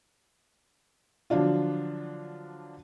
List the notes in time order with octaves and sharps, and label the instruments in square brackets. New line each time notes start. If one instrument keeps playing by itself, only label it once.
[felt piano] D3 F3 F#3 D4 F4